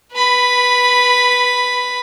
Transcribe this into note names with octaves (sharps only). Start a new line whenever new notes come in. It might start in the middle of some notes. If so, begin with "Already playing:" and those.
B4 B5